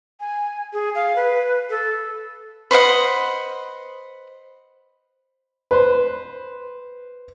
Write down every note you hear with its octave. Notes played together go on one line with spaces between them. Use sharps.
G#5
G#4
F5
B4
A4
B4 C5 D#5 F#5
B4 C5